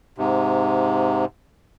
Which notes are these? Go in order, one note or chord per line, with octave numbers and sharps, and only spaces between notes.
G#2 C3